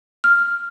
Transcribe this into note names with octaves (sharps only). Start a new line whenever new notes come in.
F6